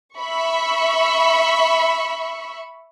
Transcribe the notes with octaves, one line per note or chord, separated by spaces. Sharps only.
E5 B5 C#6